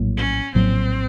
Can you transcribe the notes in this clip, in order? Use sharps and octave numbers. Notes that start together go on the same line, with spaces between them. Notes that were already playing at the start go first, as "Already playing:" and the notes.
Already playing: A#1 A2 F#3 A#3
C#4
A#1 A2 F#3 A#3 C4